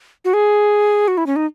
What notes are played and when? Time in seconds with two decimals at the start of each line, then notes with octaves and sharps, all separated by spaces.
0.25 F#4
0.34 G#4
1.08 F#4
1.18 E4
1.27 C#4
1.36 D#4